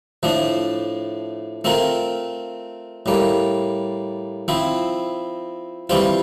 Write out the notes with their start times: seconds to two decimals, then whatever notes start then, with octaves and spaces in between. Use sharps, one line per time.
0.23 A2 F3 A3 D4
1.64 A3 C4 F4 A#4
3.06 A2 G3 A#3
4.48 F3 C4 E4
5.90 E3 G3 C4 F4 C5